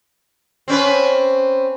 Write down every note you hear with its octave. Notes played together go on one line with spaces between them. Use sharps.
C4 C#4 B4